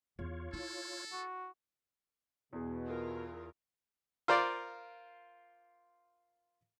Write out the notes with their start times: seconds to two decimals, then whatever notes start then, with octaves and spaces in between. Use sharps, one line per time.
0.19 E2 F4 C#5
0.53 E4 A4
1.12 F#4
2.53 E2 B2 G#4
2.87 E4 F4 A#4
4.28 F4 A#4 C5 D5